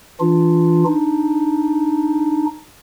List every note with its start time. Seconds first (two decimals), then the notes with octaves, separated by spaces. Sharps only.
0.20 E3 D4 F4
0.86 D4 D#4